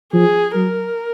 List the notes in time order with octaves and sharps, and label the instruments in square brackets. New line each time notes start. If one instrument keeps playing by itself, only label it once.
[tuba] F3 [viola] G#4
[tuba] F#3 [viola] A#4